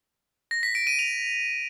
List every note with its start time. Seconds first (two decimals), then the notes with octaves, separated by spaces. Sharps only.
0.51 A#6
0.63 B6
0.75 D7
0.87 D#7
0.99 F7